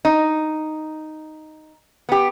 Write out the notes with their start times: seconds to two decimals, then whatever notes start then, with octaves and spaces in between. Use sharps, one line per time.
0.05 D#4
2.09 B3 G4